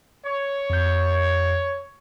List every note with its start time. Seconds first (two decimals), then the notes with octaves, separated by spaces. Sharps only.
0.25 C#5
0.70 F2 G6